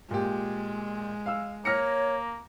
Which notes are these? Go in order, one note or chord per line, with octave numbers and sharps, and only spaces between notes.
A#2 G#3 G4
F5 E6
A#3 C#5 F6 A#6 C#7